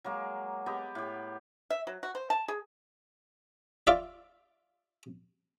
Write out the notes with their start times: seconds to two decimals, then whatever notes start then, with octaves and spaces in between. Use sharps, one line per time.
0.04 F#3 G#3 A#3
0.66 B3 G4 D#5
0.95 A2 G4
1.70 E5
1.87 F#3
2.03 F#4
2.15 C5
2.30 A5
2.48 G#4
3.87 F4 D5 E5